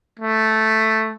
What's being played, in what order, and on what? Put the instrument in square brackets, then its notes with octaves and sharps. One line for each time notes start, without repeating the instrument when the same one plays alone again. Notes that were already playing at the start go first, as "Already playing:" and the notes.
[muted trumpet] A3